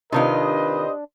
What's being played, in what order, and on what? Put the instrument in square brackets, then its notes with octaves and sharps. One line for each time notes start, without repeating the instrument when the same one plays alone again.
[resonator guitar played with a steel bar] C3 D#3 F4 [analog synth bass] D4 [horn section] G4 C5 D#5 [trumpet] B4